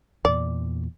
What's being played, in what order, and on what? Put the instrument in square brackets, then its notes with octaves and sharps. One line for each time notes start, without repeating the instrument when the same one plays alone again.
[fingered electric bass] E2 A#2 [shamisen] D5